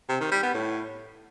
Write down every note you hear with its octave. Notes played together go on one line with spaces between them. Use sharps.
C3
D#3
G3
B3
A2